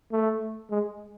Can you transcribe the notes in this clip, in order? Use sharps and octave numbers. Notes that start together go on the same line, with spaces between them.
A3
G#3